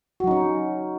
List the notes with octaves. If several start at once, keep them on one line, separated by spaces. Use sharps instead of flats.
F#3 C#4 D#4 F#4